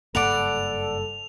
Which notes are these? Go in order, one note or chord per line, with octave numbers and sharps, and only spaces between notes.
F#1 G2 A#3 A4 D5 F#5 B5 F7